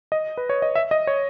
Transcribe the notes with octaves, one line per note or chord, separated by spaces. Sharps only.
D#5
B4
C#5
D#5
E5
D#5
C#5